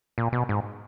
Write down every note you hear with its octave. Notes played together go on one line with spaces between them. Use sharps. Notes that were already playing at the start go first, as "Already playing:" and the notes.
A#2
B2
G#2